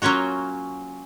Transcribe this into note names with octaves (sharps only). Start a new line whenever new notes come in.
F#3 A#3 C#4 F4 F#4